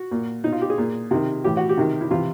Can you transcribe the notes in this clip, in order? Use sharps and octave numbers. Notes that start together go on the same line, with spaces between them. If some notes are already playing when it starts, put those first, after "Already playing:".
Already playing: F#4
A#2
B2 D#4
F4
G4
G#4
A#2
C3 D#3
A2 E3 G4
F#4
G4
C3 D#3
E4
C3 E3 F4